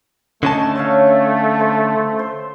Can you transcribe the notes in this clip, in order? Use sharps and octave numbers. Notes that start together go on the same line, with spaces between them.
D3 A3 C#4 D#5 A5
C#5 E5 F5
C5
C5